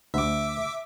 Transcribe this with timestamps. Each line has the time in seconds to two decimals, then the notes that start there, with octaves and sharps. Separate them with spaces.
0.14 D2 E5 D6